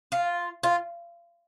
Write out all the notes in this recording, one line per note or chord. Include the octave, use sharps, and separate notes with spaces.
F4
F4